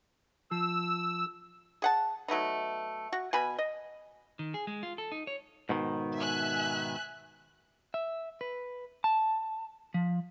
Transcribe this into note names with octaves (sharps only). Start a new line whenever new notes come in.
F3 E6
G#4 F#5 A5
F#3 A3 B3 D#4
F#4
B2 G#5 B5
D#5
D#3
G#4
G#3
F4
A4
D#4
C#5
G#2 B2 D#3
E5 G#5 F#6
E5
B4
A5
F3